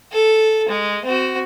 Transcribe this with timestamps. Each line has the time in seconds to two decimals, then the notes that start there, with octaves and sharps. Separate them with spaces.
0.12 A4
0.68 G#3
1.05 C4 F#4